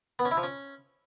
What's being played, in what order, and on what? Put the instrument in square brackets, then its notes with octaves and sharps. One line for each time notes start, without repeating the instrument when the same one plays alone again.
[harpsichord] B3
C#4
E4
F3
C#4